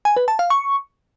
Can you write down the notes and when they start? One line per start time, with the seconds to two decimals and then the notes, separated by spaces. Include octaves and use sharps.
0.05 G#5
0.17 B4
0.28 A5
0.39 F5
0.50 C#6